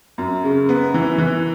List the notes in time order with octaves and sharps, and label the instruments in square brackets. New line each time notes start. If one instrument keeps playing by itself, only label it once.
[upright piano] F#2
C#3
B3
E3
E3